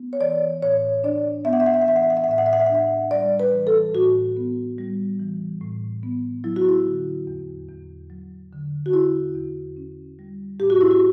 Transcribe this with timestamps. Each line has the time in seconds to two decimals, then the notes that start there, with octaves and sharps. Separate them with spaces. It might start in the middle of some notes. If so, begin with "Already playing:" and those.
Already playing: B3
0.13 C#5
0.20 E3 D5
0.62 A2 C#5
1.04 D4 D5
1.45 B3 E5
1.53 F#5
1.60 E5
1.66 F#5
1.74 E5
1.81 F#5
1.87 E3 E5
1.96 F#5
2.03 E5
2.10 F#5
2.17 E5
2.24 F#5
2.29 A2 E5
2.38 F#5
2.46 E5
2.53 F#5
2.60 E5
2.66 F#5
2.69 D4
2.75 E5
3.11 G3 D5
3.40 B4
3.53 E3
3.67 A4
3.94 A2 F#4
4.37 B3
4.78 G3
5.20 E3
5.61 A2
6.03 B3
6.44 F#3 E4
6.56 F#4
6.69 E4
6.86 D3
7.27 E2
7.68 E2
8.10 F#3
8.53 D3
8.86 F#4
8.93 E2 E4
9.35 E2
9.77 C#4
10.19 G3
10.60 A2 G4
10.70 F#4
10.81 E4
10.91 F#4